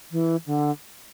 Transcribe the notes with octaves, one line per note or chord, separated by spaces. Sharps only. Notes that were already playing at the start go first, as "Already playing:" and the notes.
E3
D3